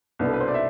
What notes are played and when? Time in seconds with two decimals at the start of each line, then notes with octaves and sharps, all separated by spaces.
0.19 C2 B2 B3 D4
0.27 A4
0.33 B4
0.41 C5
0.48 D5
0.54 E5